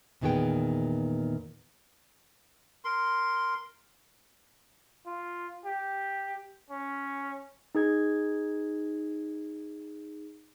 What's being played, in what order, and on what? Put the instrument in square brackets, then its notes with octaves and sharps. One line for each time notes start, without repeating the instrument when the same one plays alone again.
[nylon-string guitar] E2 A#2 D#3 B3 G#4 G5
[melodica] A#4 C6
[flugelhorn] F4
G4
C#4
[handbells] D#4 G#4 G#6